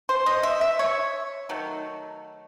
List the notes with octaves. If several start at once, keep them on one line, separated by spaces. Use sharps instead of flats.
C5
D#5
E5
E5
C#5
D#3 F#3 A3